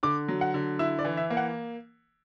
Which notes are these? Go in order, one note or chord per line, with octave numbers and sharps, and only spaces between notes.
D3 D6
F#3
F#5
D3
E4 E5
D5
E3
E5
A#3
F#5